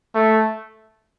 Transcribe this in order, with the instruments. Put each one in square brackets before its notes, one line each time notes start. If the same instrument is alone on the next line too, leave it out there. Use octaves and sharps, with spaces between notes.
[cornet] A3